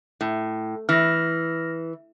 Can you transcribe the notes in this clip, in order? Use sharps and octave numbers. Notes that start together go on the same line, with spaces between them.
A2
E3 F6 A#6